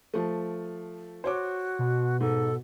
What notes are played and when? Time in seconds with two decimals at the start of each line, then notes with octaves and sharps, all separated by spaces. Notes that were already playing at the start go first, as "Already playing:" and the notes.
0.14 F3 A3
1.24 F#4 C5 C#5 D6
1.79 B2
2.20 G#2 A4